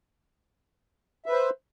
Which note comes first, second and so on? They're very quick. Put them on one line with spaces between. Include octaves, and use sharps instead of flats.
E5 B4 C5